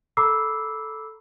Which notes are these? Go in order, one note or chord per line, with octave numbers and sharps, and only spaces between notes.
A4 A#5 B5 D6 E6 C7